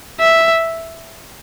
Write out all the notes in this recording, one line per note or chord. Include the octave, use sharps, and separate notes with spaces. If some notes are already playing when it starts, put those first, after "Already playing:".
E5